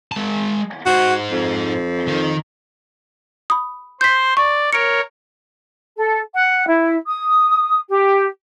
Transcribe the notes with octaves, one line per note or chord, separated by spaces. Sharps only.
G#3 A5
G#2 F#4 C5
F2
D#3
B5 D#6
C5 G6 B6
D5 C#6
A#4 C#5 C#7 D7
A4
F#5
E4
D#6
G4